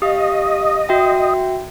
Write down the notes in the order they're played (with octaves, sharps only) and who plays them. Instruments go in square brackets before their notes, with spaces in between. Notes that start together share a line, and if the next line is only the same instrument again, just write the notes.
[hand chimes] G4 F5 [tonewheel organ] D#5
[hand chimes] F#4 E5 G5